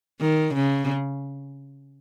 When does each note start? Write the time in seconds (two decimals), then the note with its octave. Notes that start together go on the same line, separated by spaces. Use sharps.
0.21 D#3
0.54 C#3